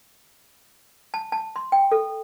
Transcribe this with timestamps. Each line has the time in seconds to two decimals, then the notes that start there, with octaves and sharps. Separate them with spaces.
1.14 A5
1.32 A5
1.56 C6
1.72 G5
1.92 A4